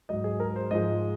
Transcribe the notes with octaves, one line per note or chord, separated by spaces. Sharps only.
G#2 F#3 D#5
G#4
A#4
C5
G#2 F3 G#3 D#5